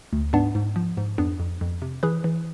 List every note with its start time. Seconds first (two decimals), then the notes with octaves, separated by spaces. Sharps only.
0.13 D2
0.33 G#2 B3 D4
0.55 G#2
0.76 F3
0.97 G#2
1.18 F2 B3 D4
1.40 F2
1.61 F2
1.82 C3
2.03 E3 G#4 B4
2.24 E3